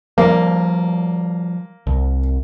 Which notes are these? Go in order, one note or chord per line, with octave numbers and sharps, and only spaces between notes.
F3 G3 A#3
C2